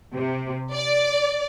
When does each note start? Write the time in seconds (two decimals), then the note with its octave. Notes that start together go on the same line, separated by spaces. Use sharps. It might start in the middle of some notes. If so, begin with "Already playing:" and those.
0.14 C3
0.72 D5